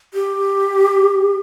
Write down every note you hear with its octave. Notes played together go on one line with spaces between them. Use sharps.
G4